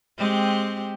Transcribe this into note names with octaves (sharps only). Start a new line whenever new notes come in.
G#3 C4 G4